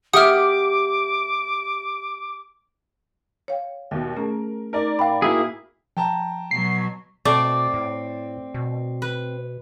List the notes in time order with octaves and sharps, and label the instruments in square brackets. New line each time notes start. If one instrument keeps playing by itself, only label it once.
[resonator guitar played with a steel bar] A#3 E5 F#5 [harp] G4 [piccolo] D6 [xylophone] D#6 F6
[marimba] C#5 F5 G5
[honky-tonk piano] D#2 B2 [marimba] E5
[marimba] A3 C#4 G#4 [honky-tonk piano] A#4
[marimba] A3 D#4 [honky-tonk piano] A#4 D5
[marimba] A2 [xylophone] F5 G5 B5
[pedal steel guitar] A#3 E4 G#4 [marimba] F#4 G#5 A#5 [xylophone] E6
[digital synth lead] F3 [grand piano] G5 A5 A#5
[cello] B2 F#3 [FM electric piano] C7
[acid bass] B2 [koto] A3 [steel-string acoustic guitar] C4 [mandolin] D5
[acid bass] A2
B2
[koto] B4